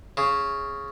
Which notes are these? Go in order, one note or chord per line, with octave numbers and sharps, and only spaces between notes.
C#3